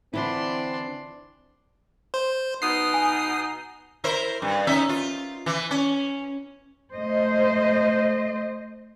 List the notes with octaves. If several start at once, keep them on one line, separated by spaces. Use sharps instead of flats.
D3 E3 C4 D4 E4 C6
C5
B2 B3 D#4 D#6 C7
G#5
E4 A#4 C5
G2
C#4 D#4 E5
F4
E3
C#4
A3 C5 D#5